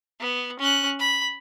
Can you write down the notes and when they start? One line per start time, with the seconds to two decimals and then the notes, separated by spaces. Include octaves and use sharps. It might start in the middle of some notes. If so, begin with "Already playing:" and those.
0.20 B3
0.59 C#4 F#6
0.99 B5